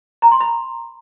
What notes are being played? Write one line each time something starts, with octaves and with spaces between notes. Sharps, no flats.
A#5
C6
B5